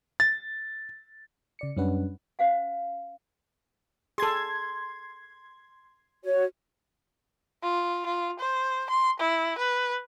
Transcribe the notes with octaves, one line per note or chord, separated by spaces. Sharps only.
A6
C#3 D5 C#7
F#2 G3 C#4 D4 B4 F#5
C#4 C5 F5 F#5
G#4 A4 C6 G#6
F#4 C#5
F4
F4
C5
C6
E4
B4